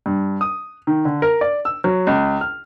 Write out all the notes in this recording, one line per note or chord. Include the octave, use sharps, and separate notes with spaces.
G2
D#6
D#3
D3
A#4
D5
E6
F#3
C#2
F6